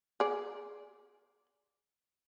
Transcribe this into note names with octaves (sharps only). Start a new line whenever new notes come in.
G#4 D5